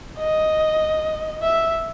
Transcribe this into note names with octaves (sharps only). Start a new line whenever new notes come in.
D#5
E5